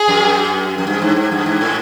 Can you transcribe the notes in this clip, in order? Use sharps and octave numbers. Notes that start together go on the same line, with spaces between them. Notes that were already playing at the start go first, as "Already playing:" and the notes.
Already playing: G#4
F#2
F#2
G2
G#2
G#2
G2
G#2
A2